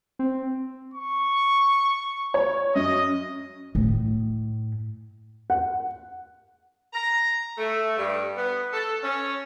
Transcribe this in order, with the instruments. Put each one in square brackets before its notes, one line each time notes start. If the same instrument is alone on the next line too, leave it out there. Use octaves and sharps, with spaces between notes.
[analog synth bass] C4
[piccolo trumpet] C#6
[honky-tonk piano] C#5
[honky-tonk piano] F#2 [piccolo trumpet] D#5
[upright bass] A2
[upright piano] F#5
[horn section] A#5
A3
G2
B3
A4
C#4